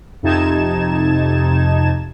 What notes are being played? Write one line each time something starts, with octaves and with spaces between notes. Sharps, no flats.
F2 C3 D#4 A5 G#6 E7